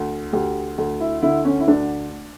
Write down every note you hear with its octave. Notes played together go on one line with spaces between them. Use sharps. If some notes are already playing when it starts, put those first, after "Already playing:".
Already playing: D2
D2 G4
D2
E4
D3 E4
C#4
E4
D2 D4